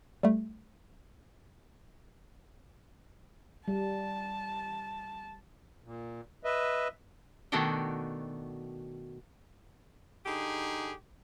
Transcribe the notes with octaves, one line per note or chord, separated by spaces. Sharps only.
G3 A3
G3 A5
A#2
B4 D#5 E5
B2 D#3 A3 D4 F#4 G5
D3 D#4 G4 G#4